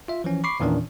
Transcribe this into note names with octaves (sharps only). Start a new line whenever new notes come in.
F4 E5
E3 F3 C#4
B5 C#6 D6 C7
E2 A#2 D#3 E3 C#4 D4